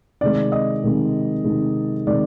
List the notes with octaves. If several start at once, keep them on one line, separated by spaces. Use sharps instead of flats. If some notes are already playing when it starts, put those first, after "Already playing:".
C3 D#3 G#3 D5
D#5
C3 D#3 G#3
C3 D#3 G#3
C3 D#3 G#3 D5